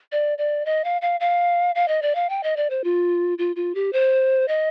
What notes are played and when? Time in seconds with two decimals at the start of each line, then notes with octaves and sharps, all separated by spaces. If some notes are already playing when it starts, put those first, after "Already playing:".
0.12 D5
0.38 D5
0.66 D#5
0.84 F5
1.02 F5
1.20 F5
1.75 F5
1.88 D#5
2.02 D5
2.15 F5
2.30 G5
2.43 D#5
2.57 D5
2.70 C5
2.84 F4
3.38 F4
3.56 F4
3.75 G4
3.93 C5
4.48 D#5